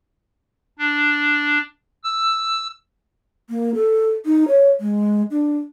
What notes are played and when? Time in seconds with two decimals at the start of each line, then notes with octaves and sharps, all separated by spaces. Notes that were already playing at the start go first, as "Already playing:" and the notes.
0.79 D4
2.04 E6
3.50 A#3
3.75 A4
4.26 D#4
4.48 C#5
4.80 G#3
5.31 D4